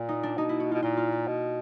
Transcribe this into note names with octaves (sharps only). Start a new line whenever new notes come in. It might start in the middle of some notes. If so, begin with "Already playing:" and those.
Already playing: A#2 A#3
D#4
D4
B2 D#4
E4
F#4
B2 F4
A#2 F4
F4
F4
B2